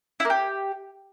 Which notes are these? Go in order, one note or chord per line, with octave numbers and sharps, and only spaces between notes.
E4
A#3
G4